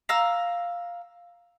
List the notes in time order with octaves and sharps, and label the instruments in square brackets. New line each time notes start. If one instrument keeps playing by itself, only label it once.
[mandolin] F5 A#5 E6